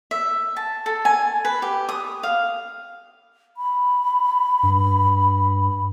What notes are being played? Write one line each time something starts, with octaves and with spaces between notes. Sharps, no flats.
E5
A5
A4
G#5
B4
G4
D#6
F5
B5
G2